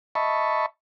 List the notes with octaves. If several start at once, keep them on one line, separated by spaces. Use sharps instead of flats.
D#5 E5 A5 B5 C#6